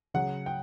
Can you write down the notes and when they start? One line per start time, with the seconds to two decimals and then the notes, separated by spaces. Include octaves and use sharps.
0.14 C#3 F#3 F#5
0.46 G5